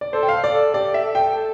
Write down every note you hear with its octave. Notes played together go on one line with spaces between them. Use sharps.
D5
A4 C5
G5
F5
D5
A4
G4 D5
E5
A4
G5
A4